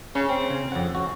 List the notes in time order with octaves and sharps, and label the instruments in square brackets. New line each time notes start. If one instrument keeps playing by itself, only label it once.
[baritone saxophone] C#3 [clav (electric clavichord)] C#4
[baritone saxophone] C4
[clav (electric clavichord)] C#3
F2 F#5
C#4 F#4